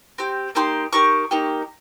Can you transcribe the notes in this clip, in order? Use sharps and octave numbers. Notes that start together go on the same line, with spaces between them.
C4 G4
A#3 D#4 G4 C6
A#3 D#4 G4 C#6
A#3 D#4 G4